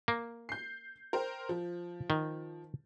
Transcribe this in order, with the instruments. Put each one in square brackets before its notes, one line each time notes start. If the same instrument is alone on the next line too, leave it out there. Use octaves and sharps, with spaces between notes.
[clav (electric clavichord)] A#3
[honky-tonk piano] G6 C7
A#4 C5 G5
F3
[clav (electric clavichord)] D#3